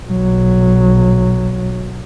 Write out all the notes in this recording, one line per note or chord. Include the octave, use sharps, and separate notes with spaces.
B1 F#3